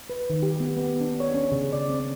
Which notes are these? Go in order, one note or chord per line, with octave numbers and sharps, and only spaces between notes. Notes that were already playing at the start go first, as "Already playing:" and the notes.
B4
D#3
G4
B3
B3
D4
C#5
C#4
C#3
D5
C4